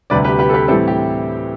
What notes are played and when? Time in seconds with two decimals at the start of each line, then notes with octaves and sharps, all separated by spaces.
0.10 D2 C3 G3 D4 B4 D5
0.24 G4 B4
0.39 G4 B4
0.49 A4
0.54 G4 B4
0.68 A2 E3 G3 C4 E4 A4
0.88 G4